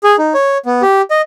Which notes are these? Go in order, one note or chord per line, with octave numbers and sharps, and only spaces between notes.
G#4
D#4
C#5
B3
G4
D#5